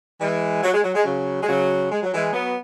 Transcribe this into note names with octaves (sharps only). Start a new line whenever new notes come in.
E3 G#3
F#3
G#3
F#3
G#3
C#3 F#3
G#3
C#3 F#3
G#3
F#3
E3 G#3
F#3 B3